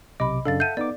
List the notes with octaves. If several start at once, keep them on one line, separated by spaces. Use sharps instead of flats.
B1 C3 D#5 B5 D6
F#2 C#3 D4 A4 F5 A6
E5 F#5 A5 G6 D#7
B3 D#4 D5 D6